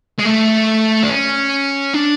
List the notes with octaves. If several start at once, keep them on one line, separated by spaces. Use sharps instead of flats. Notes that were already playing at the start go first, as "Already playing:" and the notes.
G#3
A3
D4
C#4
D4